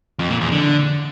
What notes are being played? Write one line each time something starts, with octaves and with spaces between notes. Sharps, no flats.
F2
A#2
E2
D3